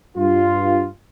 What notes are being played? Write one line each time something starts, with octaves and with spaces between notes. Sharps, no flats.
G2 F4